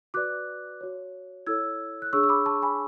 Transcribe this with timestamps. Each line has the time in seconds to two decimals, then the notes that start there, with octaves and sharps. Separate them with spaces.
0.14 F#4 B4 D5 D6 F#6
0.81 F#4 C#5
1.47 E4 A4 C#5 E6 G#6
2.02 F#6
2.13 D4 G#4 C#5 C#6 E6
2.23 E6
2.29 B5 D6
2.46 A5 C#6
2.62 G#5 B5